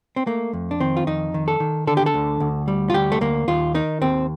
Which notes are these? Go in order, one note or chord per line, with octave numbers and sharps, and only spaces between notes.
C4
A3 A#3
F2
D4
D#3 C4
F4
F2 D#4
D#3
A4
D#3
D3 A4
G4
A4
D2
D2
G3
F4
D2 G4
A3
D2 A#3
D#2 F4
D#3 D#4
D#2 C4